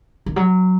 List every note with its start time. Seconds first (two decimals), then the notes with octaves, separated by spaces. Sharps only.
0.26 D#3
0.36 F#3